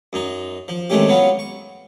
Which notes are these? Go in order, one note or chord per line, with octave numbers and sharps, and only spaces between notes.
F#2 D#4
F3
C3 D#3 G#3 A3 C#4 G4
F#3 B3 C#4 F4
C#6